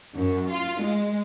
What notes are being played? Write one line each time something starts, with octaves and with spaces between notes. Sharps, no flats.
F#2
F4
G#3